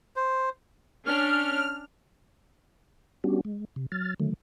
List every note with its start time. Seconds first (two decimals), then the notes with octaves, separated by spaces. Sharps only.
0.16 C5
1.06 C#4 D4 F6
3.24 G3 B3 C#4 D4 F#4 G4
3.45 G#3
3.76 C3
3.92 F#3 F6 A6
4.20 D3 D#3 F#3 A3